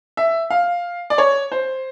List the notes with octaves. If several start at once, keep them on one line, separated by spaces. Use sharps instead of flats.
E5
F5
D5
C#5
C5